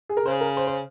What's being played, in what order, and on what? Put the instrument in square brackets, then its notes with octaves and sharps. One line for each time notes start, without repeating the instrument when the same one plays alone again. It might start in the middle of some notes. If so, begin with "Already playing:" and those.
[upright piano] G#4
A#4
[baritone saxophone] C#3 [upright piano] C5
[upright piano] A#4
C5
C5